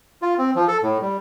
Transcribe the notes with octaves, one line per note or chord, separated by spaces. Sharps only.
F4
C4
F3
A4
A2
G3